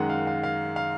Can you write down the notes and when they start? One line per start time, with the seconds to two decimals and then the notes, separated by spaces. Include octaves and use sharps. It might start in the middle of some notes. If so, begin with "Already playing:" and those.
Already playing: F#2 D#3 G#3 F#5
0.10 F5
0.27 F5
0.43 F5
0.76 F5